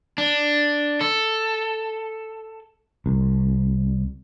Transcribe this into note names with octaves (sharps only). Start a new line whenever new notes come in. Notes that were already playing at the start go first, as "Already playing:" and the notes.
D4
A4
C2